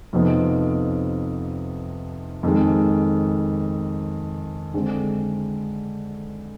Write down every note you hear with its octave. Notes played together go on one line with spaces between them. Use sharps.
F2 C3 F3 B3 D#4
F2 D#3 G#3
D3 G#3 C4